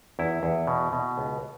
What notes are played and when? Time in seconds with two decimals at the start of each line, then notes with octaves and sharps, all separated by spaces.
0.19 E2 E4
0.43 E2
0.67 B2
0.93 B2
1.18 C#2